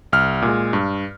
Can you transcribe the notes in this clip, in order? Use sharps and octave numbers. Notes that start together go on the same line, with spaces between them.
C2 F6
A#2 G#3
G2